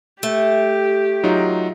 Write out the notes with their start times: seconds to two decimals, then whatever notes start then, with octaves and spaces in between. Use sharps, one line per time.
0.23 A3 G4
1.23 F#3 D#4 F4